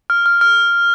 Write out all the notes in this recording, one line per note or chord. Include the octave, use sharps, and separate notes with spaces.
F6
F6
F6